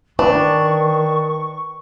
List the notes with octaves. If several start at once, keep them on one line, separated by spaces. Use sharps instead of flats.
D#3 D4 B4 C#6